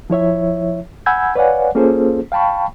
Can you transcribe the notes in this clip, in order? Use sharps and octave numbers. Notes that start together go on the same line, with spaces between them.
F3 E4 C#5 E5
F#5 G#5 B5 E6 G6 G#6
B4 C#5 D5 F5 F#5 G#5
A#3 C#4 F4 G#4 A4 C5
F5 G5 A5 B5 C#6